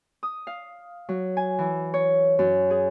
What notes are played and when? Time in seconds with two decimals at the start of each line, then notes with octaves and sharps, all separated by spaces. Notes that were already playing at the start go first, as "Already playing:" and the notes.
0.23 D#6
0.47 F5
1.09 F#3
1.37 G#5
1.59 E3
1.94 C#5
2.39 F#2
2.71 G#4